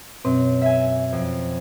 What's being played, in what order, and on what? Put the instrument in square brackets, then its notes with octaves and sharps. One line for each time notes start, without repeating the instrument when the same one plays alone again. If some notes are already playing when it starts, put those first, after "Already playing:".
[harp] F#2 [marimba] B2 C4
[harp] E5 G#5
F2